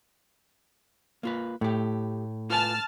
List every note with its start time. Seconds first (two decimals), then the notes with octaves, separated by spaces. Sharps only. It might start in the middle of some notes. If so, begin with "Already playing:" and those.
1.23 A#3 F4 B4
1.61 A2 A3 G4
2.50 F4 B4 G#5 A5 F6